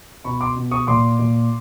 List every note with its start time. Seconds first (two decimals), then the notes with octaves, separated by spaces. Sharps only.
0.24 B2 B5 C#6
0.41 C6 D6
0.56 B2
0.71 C#6 D#6
0.87 A#2 C6 D6
1.19 A#2